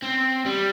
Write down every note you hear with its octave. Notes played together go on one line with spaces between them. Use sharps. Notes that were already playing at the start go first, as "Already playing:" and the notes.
C4
G3